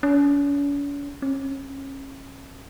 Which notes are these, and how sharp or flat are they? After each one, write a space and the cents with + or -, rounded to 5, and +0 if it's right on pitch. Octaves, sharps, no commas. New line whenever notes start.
C#4 +45
C#4 -30